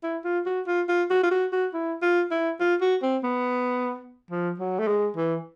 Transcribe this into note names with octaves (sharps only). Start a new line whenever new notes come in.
E4
F4
F#4
F4
F4
F#4
F4
F#4
F#4
E4
F4
E4
F4
F#4
C4
B3
F3
F#3
A3
G#3
E3